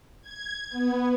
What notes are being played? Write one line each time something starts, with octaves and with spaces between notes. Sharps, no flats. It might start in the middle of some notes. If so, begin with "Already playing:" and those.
G#6
B3